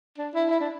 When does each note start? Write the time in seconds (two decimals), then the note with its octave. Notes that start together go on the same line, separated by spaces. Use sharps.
0.18 D4
0.34 E4
0.50 E4
0.60 D4